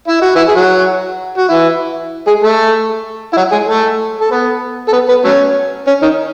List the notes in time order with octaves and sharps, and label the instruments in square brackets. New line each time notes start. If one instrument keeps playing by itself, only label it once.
[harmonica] E4
F#4
E3 E4
G#4
F#3 F#4
F#4
E3 E4
G#3 G#4
A3 A4
E4
F#3 F#4
G#3 G#4
A3 A4
A4
B3 B4
A4
B3 B4
B3 B4
F#3 A3 C#4
C#4
D#3 D#4